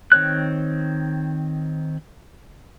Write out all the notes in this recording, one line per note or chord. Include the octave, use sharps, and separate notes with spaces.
D#3 C4 C#5 F#6